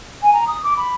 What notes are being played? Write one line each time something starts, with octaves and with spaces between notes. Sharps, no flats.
G#5
A#5
D#6
D6
B5